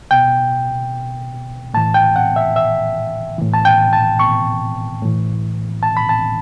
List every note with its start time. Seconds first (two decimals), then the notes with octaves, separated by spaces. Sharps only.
0.11 B2 G5
1.74 A2 E3 A5
1.94 G5
2.16 F#5
2.36 E5
2.56 E5
3.38 A2 E3
3.54 A5
3.65 G5
3.93 A5
4.19 C#6
5.02 A2 E3
5.83 A5
5.97 B5
6.09 A5